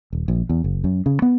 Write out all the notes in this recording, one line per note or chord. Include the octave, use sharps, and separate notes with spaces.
D#1
A#1
E2
F#1
F#2
C#3
B3